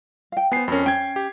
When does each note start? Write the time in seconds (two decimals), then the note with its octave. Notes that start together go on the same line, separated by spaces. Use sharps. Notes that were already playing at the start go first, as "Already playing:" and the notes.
0.32 F5 G5
0.52 B3 C5 G#5 C7
0.68 F2 C#4 A#4 B5
0.86 C#4 G5 G#6
1.16 G4